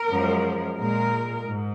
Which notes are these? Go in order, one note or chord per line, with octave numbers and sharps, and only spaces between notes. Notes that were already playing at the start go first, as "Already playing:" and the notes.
Already playing: A#4
F#2 F3 G#3
A#2 G#3 A#4
G#2